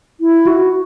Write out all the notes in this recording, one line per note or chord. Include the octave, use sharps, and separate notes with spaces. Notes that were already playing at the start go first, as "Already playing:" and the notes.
E4
F#4